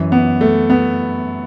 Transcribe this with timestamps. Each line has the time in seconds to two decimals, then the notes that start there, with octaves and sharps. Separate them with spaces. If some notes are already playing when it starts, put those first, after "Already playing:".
Already playing: F#2 E3
0.12 B3
0.41 A3
0.70 B3